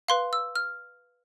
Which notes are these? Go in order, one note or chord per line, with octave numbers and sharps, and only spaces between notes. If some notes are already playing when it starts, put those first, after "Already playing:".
B4 F5 C6
E6
F6